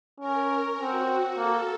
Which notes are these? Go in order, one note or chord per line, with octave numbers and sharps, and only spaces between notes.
C#4 A#4
C4 F#4
A#3 A4